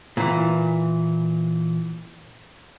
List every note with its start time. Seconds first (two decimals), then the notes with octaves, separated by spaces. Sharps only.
0.17 A#2 E3